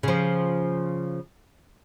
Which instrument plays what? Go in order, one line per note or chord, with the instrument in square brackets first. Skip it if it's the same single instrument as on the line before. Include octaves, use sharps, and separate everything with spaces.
[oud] C#3 F3